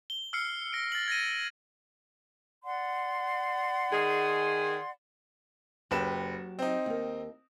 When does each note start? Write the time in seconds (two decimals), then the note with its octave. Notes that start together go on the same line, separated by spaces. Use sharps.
0.10 G7
0.33 E6 F6 C7 C#7
0.73 A#6 D7
0.92 A6 A#6 F#7
1.08 G#6 A#6 D#7
2.64 D5 F#5 C6
3.91 D#3 G#4
5.91 F#1 F#3 G4 B4 G5 E7
6.59 C4 D#4
6.86 D#2 A#4